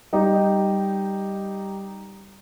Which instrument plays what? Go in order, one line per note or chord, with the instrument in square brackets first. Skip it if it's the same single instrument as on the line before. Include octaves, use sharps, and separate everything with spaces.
[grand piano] G3 D#4 G4